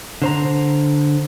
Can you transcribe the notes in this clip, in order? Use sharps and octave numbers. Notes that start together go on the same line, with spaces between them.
D3 C5 A#5